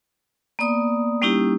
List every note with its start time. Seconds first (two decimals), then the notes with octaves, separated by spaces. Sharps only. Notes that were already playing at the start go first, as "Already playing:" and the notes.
0.59 A#3 B3 D5 D#6
1.22 G3 A#3 C#4 D#4 E4 G4